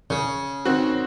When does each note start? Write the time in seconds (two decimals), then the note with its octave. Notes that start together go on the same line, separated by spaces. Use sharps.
0.10 C#3
0.65 D#3 C4 F#4